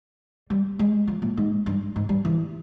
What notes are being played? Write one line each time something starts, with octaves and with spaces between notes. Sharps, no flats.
G3
G#3
F3
A#2
G#2
G2
G#2
G3
E3